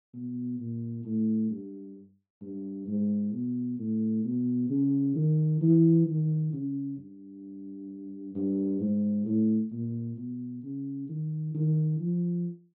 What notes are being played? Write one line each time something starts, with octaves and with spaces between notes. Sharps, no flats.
B2
A#2
A2
G2
G2
G#2
B2
A2
B2
C#3
D#3
E3
D#3
C#3
G2
G2
G#2
A2
A#2
B2
C#3
D#3
D#3
F3